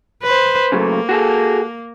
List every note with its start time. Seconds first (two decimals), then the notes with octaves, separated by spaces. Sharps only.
0.23 B4 C5
0.72 C#3 F#3 A3 A#3
1.09 F#4 G#4 A4